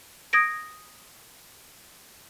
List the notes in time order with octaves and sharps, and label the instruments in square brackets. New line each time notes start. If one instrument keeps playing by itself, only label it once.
[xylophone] D#6 G#6 A#6 D7